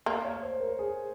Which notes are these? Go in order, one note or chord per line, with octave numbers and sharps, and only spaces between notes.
A#3 F5
C#5
C5
A#4
G#4